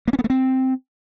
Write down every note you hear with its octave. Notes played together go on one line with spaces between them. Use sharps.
A#3
C#4
B3
A3
C4